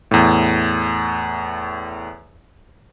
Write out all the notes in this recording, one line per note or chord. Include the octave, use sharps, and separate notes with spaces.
E2 A2